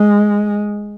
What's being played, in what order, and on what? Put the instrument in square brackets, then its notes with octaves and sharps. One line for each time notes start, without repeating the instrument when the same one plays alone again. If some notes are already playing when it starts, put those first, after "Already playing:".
Already playing: [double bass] G#3